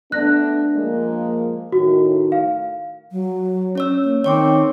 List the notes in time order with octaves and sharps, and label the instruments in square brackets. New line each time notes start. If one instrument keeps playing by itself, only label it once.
[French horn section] A3 B3 D4 [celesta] F#6 A#6
[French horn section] F3 G#3 A#3
[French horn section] A2 D#3 [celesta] F#4
[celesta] F5
[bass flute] F#3
[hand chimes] C#4 C#5 E6
[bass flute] A#3
[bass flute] D#3 [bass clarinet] C4 [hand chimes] C#5 C#6 D6